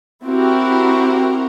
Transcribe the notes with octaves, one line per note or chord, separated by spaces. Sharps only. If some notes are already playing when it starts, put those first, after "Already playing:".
C4 E4 F#4 G4 A#4